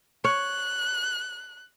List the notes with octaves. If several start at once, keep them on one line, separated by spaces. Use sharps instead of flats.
C#5 F#6